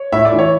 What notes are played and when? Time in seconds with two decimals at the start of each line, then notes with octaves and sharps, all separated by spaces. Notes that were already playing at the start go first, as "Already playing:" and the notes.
Already playing: C#5
0.12 A2 E5
0.25 D5
0.32 E3
0.39 C#5